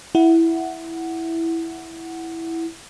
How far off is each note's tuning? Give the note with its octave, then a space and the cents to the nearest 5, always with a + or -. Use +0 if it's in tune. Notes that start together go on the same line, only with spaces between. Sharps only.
E4 +0 F#5 +0